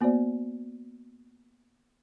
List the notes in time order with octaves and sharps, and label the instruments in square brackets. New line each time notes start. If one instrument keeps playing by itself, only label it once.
[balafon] A#3 B3 F#4 C5 D5